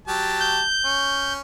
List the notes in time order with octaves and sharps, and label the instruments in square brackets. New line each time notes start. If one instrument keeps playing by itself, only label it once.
[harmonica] F#3 G4 A5
[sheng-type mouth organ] G6
[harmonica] C#4